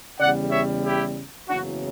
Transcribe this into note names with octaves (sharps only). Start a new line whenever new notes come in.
E2 C#3 G3 D5 F#5
C#5 E5
E4 G4
F#1 E2 C#3 F#3 D4 F#4